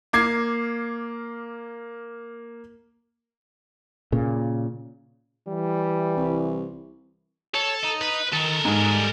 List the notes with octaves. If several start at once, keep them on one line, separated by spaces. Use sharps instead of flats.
A#3 D6 G#6 C7
A#2 C#3
E3 G3
C2
A4 C#5
D#5 A#5
B4
D#3 A4 A#4
G#2 G3 G#5